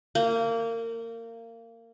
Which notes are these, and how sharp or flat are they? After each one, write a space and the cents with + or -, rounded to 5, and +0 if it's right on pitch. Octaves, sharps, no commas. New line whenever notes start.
A#3 -25